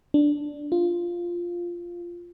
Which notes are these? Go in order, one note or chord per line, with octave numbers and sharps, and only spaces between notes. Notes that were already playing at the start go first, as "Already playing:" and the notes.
D4
F4